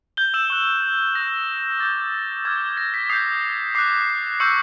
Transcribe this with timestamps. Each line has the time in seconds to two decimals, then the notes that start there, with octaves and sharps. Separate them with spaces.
0.17 G6 G7
0.34 E6 E7
0.50 C#6 F#6
1.15 D#6 F#6 A#6
1.79 D6 G6 A6
2.45 D6 F6 G#6
2.77 A#6
2.94 B6
3.10 D#6 G6 C7
3.75 D6 F#6 C7
4.40 C#6 E6 G6 C#7